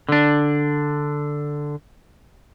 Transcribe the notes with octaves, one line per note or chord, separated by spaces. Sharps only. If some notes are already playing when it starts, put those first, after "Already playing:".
D3 D4